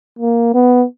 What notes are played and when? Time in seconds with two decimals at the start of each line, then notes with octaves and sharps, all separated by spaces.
0.19 A#3
0.54 B3